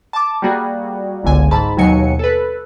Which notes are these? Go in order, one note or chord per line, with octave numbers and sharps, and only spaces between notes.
A5 D6
G3 A#3 F#4 G#4
G1 C#2 D3 G#5
G#2 A5 B5
D#2 B2 F#3 G#5 C#7
A4 B4